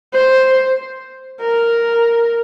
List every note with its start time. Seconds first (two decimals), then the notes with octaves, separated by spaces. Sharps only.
0.14 C5
1.41 A#4